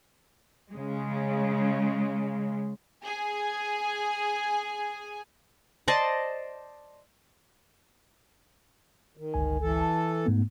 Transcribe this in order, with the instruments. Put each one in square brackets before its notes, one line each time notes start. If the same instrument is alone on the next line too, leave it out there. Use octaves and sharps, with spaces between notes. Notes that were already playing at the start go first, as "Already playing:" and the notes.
[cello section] C#3 G#3
[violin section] G#4 G#5
[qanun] C5 D5 D#5 A5
[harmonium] D#3
[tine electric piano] G1 C#2 G#5
[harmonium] E3 A4
[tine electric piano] A5
G#2 A3 B3